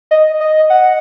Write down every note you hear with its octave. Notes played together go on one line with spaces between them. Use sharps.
D#5
D#5
F#5